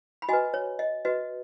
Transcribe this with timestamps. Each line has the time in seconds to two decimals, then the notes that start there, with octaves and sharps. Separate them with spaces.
0.22 B5
0.29 F#4 B4 D#5 G#5
0.54 C#5
0.79 D#5
1.05 F#4 B4 D#5